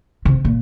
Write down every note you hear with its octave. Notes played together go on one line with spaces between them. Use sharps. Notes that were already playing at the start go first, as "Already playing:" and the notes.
C3
A#2